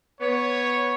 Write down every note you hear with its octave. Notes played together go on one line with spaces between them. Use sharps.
B3 C#5